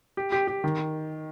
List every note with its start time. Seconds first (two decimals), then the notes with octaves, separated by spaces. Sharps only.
0.17 G4
0.32 G4
0.48 G4
0.64 D#3